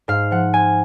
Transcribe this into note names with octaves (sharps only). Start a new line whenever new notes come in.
G#2 F5
F3 F#5
C4 G#5